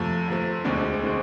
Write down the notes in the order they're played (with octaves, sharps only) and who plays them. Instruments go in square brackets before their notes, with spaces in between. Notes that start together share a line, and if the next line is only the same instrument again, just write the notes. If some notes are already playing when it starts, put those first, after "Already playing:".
Already playing: [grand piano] F2 C3 F3 A3
F2 C3 F3 A3
E1 D2 D3 G#3 C4
D3 G#3 C4